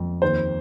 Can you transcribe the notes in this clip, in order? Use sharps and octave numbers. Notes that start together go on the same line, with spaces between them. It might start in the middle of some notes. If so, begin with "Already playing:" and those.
Already playing: F2
D#2 C5